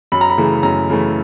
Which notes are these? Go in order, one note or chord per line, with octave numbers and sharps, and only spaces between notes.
F#2 B5
A#5
B5
C#3 E3 A3
F#2 A#5
C#3 E3 A3